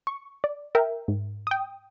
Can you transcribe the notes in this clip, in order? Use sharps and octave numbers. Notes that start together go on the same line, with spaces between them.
C#6
D5
A#4 E5 G5
G#2
G5 D#6